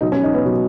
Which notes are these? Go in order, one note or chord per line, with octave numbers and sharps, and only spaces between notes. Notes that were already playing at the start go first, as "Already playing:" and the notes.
B2 F#3 D#4
C#4
D#4
B3
B2 F#3